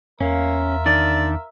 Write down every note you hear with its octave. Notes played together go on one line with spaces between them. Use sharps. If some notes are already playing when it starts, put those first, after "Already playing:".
E2 A#3 C#4 F4 A#4 E5
D#3 D4 D5